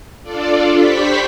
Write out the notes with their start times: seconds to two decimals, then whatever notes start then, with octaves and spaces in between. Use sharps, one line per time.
0.22 D4 F4 A4 D5
0.75 G4 C5 B5 C#6 B6